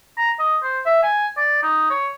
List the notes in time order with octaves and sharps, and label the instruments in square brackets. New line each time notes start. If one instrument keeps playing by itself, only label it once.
[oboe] A#5
D#5
C5
E5
G#5
D5
D#4
C#5